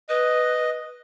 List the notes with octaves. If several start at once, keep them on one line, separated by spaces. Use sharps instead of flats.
B4 D#5